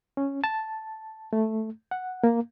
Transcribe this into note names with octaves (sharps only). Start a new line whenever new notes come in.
C#4
A5
A3
F#5
A#3